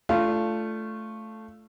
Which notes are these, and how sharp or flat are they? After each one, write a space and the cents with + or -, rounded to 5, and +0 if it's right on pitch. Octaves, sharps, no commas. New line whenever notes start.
A3 -5 D4 +0 F4 -20